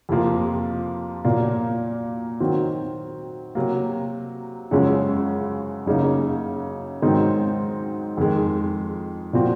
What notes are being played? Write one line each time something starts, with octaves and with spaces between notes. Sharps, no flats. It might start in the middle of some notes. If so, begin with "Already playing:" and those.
F2 C3 F3 A#3 F4
A#2 F#3 A#3
D#3 F#3 C4 F#4
C3 F#3 A#3
F#2 C#3 F3 G#3 C#4
F#2 C#3 F#3 A#3 D#4
G#2 D#3 F#3 C4 D#4
F2 D#3 G#3
A#2 F3 C4 F#4